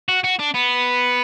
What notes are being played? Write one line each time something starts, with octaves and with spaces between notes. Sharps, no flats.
F#4
F#4
D4
B3